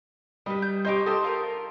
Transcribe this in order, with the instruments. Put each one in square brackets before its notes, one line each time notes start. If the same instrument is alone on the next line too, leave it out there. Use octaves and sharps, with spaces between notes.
[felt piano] G3 [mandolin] B4 D#5
[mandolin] G6
[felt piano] G4 D#5 G6 [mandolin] C5 C#5 D6
[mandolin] D#4 G4 C5 [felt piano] A4
[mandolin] F4 A#4